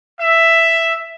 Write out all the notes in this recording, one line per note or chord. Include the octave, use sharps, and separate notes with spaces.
E5